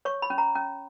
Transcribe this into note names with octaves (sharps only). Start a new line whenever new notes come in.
C#5 C#6
B5
C#4
A#5
C#4